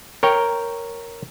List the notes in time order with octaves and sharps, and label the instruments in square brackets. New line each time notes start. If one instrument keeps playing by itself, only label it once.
[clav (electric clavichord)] A#4 C#5 G5